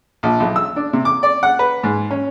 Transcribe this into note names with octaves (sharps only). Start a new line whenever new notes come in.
A#1
B1
E6
D4
C3
D6
D5
F#5
B4
G#2
C#4